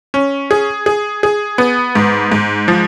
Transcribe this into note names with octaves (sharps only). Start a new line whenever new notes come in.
C#4
G#4
G#4
G#4
B3
G#2
G#2
F3